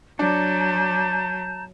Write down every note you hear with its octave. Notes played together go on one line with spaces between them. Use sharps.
F#3 D4 A5 A#5 G6